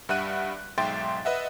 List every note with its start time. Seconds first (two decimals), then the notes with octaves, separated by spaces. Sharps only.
0.09 G2 G3 E5 F#5 F#6 D#7
0.78 B1 G#2 E5 G5 C6 A6
1.25 B4 D#5 E5 F#5